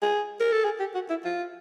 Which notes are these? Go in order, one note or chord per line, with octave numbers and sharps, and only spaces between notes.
G#4
A#4
A4
G#4
G4
F#4
E4
F4